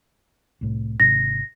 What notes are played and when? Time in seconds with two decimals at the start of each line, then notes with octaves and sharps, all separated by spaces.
0.61 C2 A2
1.00 G#1 C3 A#6